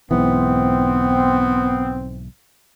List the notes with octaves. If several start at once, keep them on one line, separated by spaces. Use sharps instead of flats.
B1 G#2 E3 B3 C4